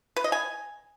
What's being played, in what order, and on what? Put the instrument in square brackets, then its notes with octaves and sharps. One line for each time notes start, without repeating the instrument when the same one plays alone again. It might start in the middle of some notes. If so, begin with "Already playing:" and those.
[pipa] B4
D#5
G#5